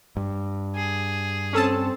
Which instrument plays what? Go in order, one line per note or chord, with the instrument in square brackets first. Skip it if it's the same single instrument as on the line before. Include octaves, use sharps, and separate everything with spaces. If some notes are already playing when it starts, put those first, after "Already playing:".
[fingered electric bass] G2
[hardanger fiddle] G#4
[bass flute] C4 [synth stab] C#4 A4 A5